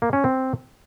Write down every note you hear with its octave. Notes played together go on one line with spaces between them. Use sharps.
A#3
C#4
C4